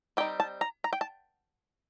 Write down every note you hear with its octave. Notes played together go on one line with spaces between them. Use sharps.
G3 C4 D#4 G5
A5
A#5
A#5
G5
A5